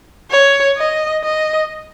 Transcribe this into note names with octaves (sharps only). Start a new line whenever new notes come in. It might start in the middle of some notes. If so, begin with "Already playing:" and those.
C#5
D#5
D#5